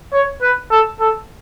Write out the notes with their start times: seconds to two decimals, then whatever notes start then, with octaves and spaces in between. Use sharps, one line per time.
0.13 C#5
0.42 B4
0.71 A4
1.00 A4